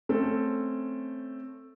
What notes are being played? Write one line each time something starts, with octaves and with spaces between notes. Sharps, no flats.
A3 C4 C#4 A4